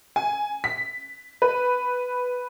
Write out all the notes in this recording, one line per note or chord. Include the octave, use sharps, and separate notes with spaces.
G#5
B6
B4